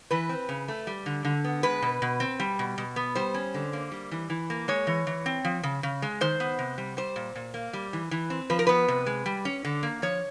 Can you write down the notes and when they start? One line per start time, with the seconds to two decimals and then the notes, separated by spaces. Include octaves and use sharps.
0.11 E3 B4
0.29 C4
0.49 C#3
0.68 A3
0.87 G3
1.06 D3
1.25 D3
1.44 B3
1.63 G#3 B4
1.82 B2
2.02 B2
2.20 C4
2.40 G3
2.59 B2
2.78 B2
2.96 B3
3.15 G3 C5
3.34 C#4
3.54 D3
3.73 A#3
3.92 G3
4.11 E3
4.30 E3
4.50 A#3
4.68 G#3 C#5
4.87 E3
5.07 E3
5.26 C4
5.45 F3
5.63 C#3
5.83 C#3
6.02 G#3
6.21 D#3 C5
6.40 B3
6.59 C3
6.78 G3
6.97 G3 C5
7.16 A#2
7.35 A#2
7.54 A#3
7.73 G3
7.93 E3
8.11 E3
8.30 C4
8.50 F3 B4
8.59 A#4
8.67 B3 B4
8.88 C3
9.06 G#3
9.26 G3
9.45 C#4
9.65 D3
9.83 A#3
10.02 F3 C#5